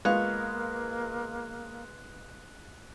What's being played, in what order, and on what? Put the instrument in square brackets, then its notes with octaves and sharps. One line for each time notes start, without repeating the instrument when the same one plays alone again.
[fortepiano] G#3 B3 F4 [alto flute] A#3 [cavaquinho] F5 C#6 [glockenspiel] F#6